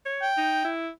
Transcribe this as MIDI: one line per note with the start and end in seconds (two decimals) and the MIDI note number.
0.06 0.28 73
0.22 0.69 79
0.37 0.64 63
0.65 0.89 64